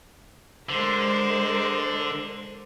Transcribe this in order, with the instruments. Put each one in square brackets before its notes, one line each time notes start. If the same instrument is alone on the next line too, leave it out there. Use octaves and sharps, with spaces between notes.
[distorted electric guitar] D3 [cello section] G#3 A#4 C5